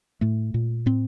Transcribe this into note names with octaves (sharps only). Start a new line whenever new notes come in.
A2 A3
A#2
A2 C4